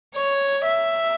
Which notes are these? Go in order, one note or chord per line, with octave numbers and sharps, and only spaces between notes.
C#5
E5